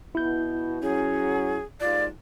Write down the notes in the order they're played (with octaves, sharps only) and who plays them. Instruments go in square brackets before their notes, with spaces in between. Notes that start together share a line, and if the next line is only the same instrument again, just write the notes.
[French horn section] B2 [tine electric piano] E4 G6
[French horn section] F#3 C#4 [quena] G#4
[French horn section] D#2 G#2 F4 [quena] D5